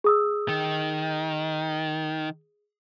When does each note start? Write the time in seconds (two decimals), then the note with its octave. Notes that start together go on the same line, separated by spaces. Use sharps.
0.04 G#4 D#6 E6
0.49 D#3